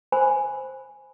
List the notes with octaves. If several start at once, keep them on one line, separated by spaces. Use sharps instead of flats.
C5 G#5 B5